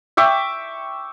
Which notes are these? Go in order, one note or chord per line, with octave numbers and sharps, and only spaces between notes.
E5 G5 C#6 D6